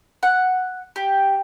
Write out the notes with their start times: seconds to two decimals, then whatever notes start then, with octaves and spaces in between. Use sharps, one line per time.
0.23 F#5
0.96 G4